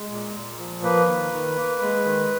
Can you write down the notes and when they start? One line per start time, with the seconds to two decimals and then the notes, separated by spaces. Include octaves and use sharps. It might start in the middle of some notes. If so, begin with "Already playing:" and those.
Already playing: G#3
0.10 A#2
0.35 A#2
0.59 F3
0.83 A#3 B4
1.07 D#3
1.32 D#3
1.56 A#3
1.81 G#3
2.05 D#3